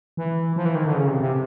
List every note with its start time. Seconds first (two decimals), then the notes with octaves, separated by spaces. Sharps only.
0.17 E3
0.56 F3
0.65 E3
0.75 D#3
0.85 D3
0.95 C#3
1.08 C3
1.20 C3